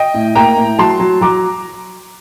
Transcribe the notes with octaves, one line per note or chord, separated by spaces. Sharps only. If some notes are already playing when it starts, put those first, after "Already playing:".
Already playing: D#5 G5
A2
A#3 G5 A#5
A2
F#3 A5 C6
F#3
F#3 A#5 D6